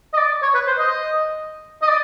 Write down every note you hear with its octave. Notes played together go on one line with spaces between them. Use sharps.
D#5
D5
C#5
B4
C5
D#5
D#5
D5